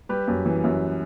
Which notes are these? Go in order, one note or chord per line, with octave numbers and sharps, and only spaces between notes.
G3 G4 B4
F#2
E3
F#2